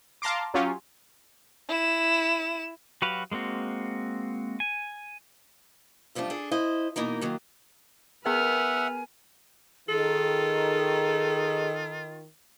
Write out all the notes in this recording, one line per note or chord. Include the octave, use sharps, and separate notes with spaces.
F5 A5 A#5 C6 D6
F#3 C#4 F4 G4
E4 E7
F#3 F#4 G4 B4 F5
G#3 A#3 C4 F#4
G#5
F#2 F3 G3 A3 D4
D4 G#4 A4
E4 C5 D#5
B2 E3 A#3 D#4 A#4
D#3 F#3 A#3
B3 A#4 B4 E5 F#5 G#5 F6
D#3 F4 G#4 A4